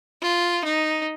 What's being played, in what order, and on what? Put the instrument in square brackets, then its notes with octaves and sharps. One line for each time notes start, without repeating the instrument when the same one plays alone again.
[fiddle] F4
D#4